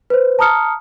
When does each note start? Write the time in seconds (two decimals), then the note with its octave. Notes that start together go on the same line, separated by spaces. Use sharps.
0.10 B4 C5
0.39 A5 A#5 D#6 F6 C#7